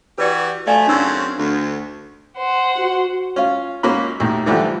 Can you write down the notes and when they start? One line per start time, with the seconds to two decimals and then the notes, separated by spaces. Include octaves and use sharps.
0.18 E3 F#4 G4 B4 D5
0.67 F3 A3 D5 F5 G#5
0.87 F#2 C#3 C4 D4 D#4 E6
1.38 D2
2.38 C5 F#5
2.78 F#4
3.36 C#4 F4
3.83 G#1 A#3 C#4 F#4 B5
4.20 D#2 A2
4.46 G#2 D3 E3 F3 G3 A3